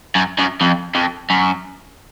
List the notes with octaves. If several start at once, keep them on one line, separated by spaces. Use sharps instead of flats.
F#2
F#2
F2
F2
F#2